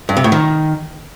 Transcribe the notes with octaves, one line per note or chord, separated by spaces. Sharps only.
G2
C3
A2
D#3